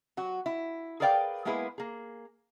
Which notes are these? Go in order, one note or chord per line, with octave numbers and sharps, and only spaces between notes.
F#3 F#4
E4
G#4 A#4 B4 D5 F5 G5
G#3 A#3 B3 E4 G#4 B4
A#3 G#4